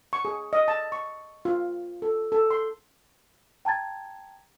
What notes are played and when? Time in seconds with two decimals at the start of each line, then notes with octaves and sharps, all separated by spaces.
0.13 C#6
0.25 G#4
0.53 D#5
0.68 A5
0.92 C#6
1.45 F4
2.02 A4
2.32 A4
2.51 C6
3.65 G5 A5 A#5 G#6 A6